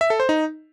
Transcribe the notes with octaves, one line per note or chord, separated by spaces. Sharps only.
E5
A4
C5
D#4